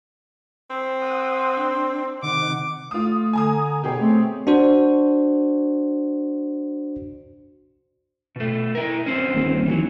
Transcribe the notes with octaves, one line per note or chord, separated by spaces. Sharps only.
C4
F#5 C6 D#6
D4
C3 D#3 F#5 D6
A3 F4 D#6
D3 G#5 A#5 D#6
B2 B3 G4 G#4 C#5
A3 C4
D4 F#4 C5
B2 A3
E4 A#4
G2 C4 C#4
D#1
D#2 E3 F#3